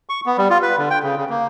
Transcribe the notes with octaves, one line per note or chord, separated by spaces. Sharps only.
C#6
B3
G3
F4
B4
D3
G5
C#3
C#3
A#3